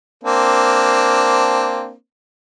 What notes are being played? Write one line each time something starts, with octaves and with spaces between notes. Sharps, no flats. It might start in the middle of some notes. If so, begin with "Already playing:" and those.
A#3 C4 D4